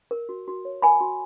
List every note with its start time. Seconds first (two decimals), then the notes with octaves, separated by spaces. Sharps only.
0.11 A#4
0.29 F#4
0.48 F#4
0.65 C#5
0.82 A#4 G#5 B5
1.01 F#4